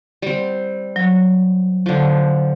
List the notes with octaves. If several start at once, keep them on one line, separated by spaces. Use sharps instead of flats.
G3 C4
F#3
D3 F3